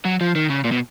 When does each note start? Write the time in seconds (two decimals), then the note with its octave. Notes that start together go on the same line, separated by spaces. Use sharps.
0.05 F#3
0.21 F3
0.35 D#3
0.50 C#3
0.64 A#2
0.72 B2